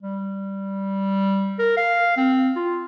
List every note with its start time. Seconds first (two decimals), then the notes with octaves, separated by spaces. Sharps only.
0.03 G3
1.59 A#4
1.77 F5
2.17 C4
2.56 F4